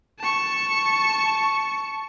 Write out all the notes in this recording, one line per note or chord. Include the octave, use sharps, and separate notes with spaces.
A5 C#6